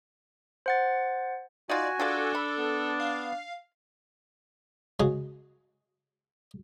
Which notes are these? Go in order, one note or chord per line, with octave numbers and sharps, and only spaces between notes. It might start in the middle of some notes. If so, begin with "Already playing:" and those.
C5 F#5 A6
D#4 F4 F#4 D5 G#5
D4 F4 G#4 A4 D5
B5
B3
F5
C#3 G#3 F#4 G#4